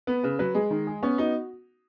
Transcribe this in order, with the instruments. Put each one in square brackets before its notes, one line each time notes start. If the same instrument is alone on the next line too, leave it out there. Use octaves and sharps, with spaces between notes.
[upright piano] B3 [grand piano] B4
[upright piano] C#3 [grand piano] B4
[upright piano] F#3 [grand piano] B4
[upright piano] G#3 [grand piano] G#4
[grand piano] D#3
G#4
[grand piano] B3 [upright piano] C#4
[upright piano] D#4 [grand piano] F#4